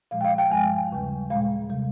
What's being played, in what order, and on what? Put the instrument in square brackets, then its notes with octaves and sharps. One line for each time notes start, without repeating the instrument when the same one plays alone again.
[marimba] A#2 F3 G#3 F5
G5
F5
G5
G2 F3 G#3 G#5
D#2 C#3 G3
A#2 G#3 F5
C3 G3